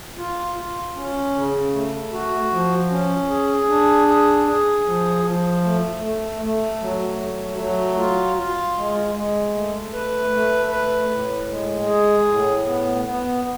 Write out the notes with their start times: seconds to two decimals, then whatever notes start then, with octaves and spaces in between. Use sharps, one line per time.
0.18 F4
0.56 F4
0.95 C#4
1.35 C#3
1.74 A3
2.12 F#4
2.51 F3
2.91 C#4
3.30 G#4
3.69 D4
4.08 G#4
4.47 G#4
4.86 F3
5.25 F3
5.64 A3
6.03 A3
6.42 A3
6.81 F#3
7.20 A3
7.59 F#3
7.98 F4
8.37 F4
8.76 G#3
9.15 G#3
9.54 A3
9.93 B4
10.32 A3
10.71 B4
11.10 A2
11.50 G#3
11.88 G#4
12.27 A2
12.67 B3
13.06 B3